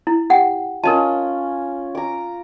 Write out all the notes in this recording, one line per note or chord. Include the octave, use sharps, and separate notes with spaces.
E4
G4 F#5 G5
C#4 F4 A#4 D#5 A5
A#5 D6